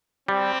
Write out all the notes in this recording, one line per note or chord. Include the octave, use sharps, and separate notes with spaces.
G3 C4